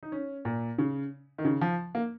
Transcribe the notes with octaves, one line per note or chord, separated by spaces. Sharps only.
D#4
C#4
A#2
C#3
D#3
C#3
F3
A#3